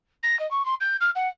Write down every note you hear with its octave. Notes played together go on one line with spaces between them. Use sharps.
A#6
D#5
C#6
C6
G6
F6
F#5